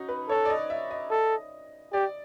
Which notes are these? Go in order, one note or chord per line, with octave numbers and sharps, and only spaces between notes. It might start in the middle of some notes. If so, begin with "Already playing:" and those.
Already playing: C#4 D#4 F#4
B4
A4 C#5
D5
D#5
E5
D#5
A4
G4 D5